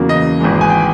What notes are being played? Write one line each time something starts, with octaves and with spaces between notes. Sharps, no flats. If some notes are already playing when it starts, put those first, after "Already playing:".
Already playing: E2 C#3 F#3 A#3
D#5
G#1 G#2 E3 G#3
G#5
G5